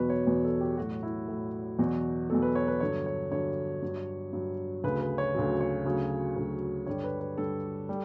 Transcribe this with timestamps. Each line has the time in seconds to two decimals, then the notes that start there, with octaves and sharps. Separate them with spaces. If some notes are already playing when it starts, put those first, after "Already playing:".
Already playing: E2 B2 F#3 F#4 B4
0.10 C#5
0.26 E2 B2 F#3 B4
0.44 A4
0.61 G4
0.77 A2 F#3 F#4
1.03 E4
1.28 A2 F#3
1.79 E2 B2 F#3 F#4
2.29 E2 B2 F#3 A4
2.42 B4
2.55 C#5
2.68 B4
2.80 G2 D3 F#3 C#5
3.06 C#5
3.31 G2 D3 F#3 C#5
3.83 G2 F#3
4.33 G2 F#3
4.84 D2 C#3 F#3 B4
5.01 B4
5.18 C#5
5.35 D2 C#3 F#3
5.60 C#5
5.85 D2 C#3 F#3
6.36 D2 C#3 F#3
6.86 G2 D3 G3 C#5
7.04 B4
7.20 B4
7.37 G2 D3 G3 A4
7.89 G3